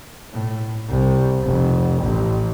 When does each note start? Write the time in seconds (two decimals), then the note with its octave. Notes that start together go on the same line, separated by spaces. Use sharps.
0.32 A2
0.89 C2
1.42 F1
2.02 A1